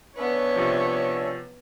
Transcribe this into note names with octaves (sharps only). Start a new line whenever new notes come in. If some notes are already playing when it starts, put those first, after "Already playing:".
B3 C#4 D4 C#5 E5
C3 F3